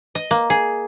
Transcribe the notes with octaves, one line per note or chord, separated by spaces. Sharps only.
D#5
A#3
G#4